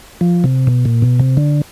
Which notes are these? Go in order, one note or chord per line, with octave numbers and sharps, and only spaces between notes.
F3
C3
B2
A#2
B2
C3
D3